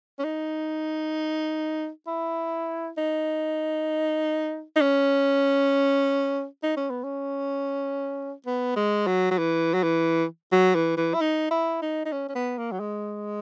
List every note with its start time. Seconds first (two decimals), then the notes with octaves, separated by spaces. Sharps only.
0.19 C#4
0.24 D#4
2.07 E4
2.98 D#4
4.76 D#4
4.81 C#4
6.63 D#4
6.77 C#4
6.90 B3
7.04 C#4
8.46 B3
8.76 G#3
9.07 F#3
9.31 F#3
9.38 E3
9.74 F#3
9.83 E3
10.52 F#3
10.75 E3
10.97 E3
11.14 E4
11.21 D#4
11.51 E4
11.82 D#4
12.05 D#4
12.12 C#4
12.29 C#4
12.35 B3
12.58 A#3
12.72 F#3
12.80 G#3